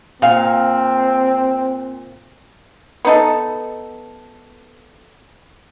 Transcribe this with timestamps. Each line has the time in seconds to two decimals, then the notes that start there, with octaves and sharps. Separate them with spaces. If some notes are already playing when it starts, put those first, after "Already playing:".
0.22 A#2 C4 F5
3.05 B3 D#4 A4